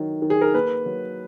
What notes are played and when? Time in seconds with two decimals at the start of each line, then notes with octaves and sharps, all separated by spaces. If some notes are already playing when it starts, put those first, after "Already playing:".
Already playing: D#3 F#3
0.22 D#3
0.30 G#4
0.41 A#4
0.54 A#3 B4
0.86 F#3